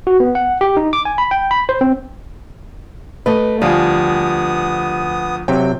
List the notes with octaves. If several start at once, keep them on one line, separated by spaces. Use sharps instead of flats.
F#4
B3
F#5
G4
D#4
D6
G#5
B5
G5
B5
C5
C4
A3 B4 D#5
D2 F3 G3 B3 G#5 D#6
C3 F#3 G5